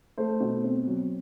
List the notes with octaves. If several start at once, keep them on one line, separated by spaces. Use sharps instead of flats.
A3 C5
B2
C4
F#3